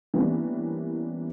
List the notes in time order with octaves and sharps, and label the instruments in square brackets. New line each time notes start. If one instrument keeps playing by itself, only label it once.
[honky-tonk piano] E3 G3 A#3 B3 C#4 D4